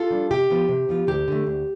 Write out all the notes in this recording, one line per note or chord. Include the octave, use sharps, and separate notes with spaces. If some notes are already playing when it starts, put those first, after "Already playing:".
Already playing: F4 A4
G3 D4
C3 G4
F3 B3 F4
C3
F3 B3 F4
D2 G4
D3 A3
D2